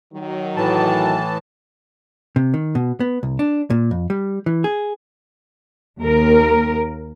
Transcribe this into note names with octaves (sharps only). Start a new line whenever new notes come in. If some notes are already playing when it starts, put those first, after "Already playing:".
D#3 F#3
A2 E3 A5
C3
D#3
B2
B3
C2
D4
A#2
F2
G3
E3
G#4
D#2 A#4